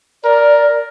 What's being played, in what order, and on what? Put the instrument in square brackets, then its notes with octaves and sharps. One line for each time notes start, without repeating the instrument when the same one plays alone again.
[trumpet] A#4 [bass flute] D5